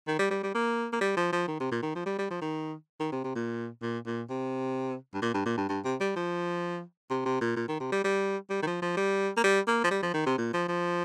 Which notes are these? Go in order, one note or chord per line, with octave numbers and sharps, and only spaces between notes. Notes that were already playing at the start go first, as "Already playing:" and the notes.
D#3
G3
G3
G3
A#3
A#3
G3
F3
F3
D#3
C3
A#2
D#3
F3
G3
G3
F3
D#3
D#3
C3
C3
A#2
A#2
A#2
C3
G2
A#2
G2
A#2
G2
G2
C3
G3
F3
C3
C3
A#2
A#2
D#3
C3
G3
G3
G3
D#3
F3
F3
G3
A#3
G3
A#3
F3
G3
F3
D#3
C3
A#2
F3
F3